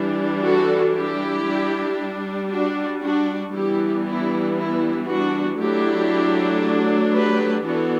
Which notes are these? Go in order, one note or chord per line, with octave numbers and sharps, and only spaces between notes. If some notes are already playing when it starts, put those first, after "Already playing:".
Already playing: E3 G3 D4
F#4 A4
E4 G4
G3 D4
D4 F#4
D4 F#4
E3 G3 B3 D4 E4 G4
E4
E4
D4 F#4
F#3 A3 D4 E4 G4
G4 B4
E3 B3 D4 F#4 A4